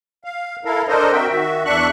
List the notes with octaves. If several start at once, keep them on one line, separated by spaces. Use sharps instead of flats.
F5
E4 A4 A#4 F5
D4 A4 A#4 C5 D#5
C4 F#4 A#4 E5 G5
D#3 F#4 E5
E2 D4 E5 C#6 F#6